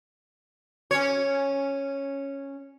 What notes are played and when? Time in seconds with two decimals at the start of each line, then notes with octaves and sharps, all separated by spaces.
0.91 C#4 C#5